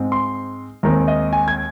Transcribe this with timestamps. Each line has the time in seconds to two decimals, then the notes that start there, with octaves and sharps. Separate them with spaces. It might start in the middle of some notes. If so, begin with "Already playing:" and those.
Already playing: G#2 G#3 C4
0.12 C6
0.83 D#2 D#3 G#3 C4 A#5
1.08 D#5
1.33 G#5
1.48 G#6